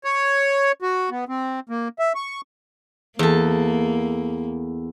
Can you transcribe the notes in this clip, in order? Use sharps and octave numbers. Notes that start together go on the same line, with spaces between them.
C#5
F#4
B3
C4
A#3
E5
C#6
E2 A#3 A4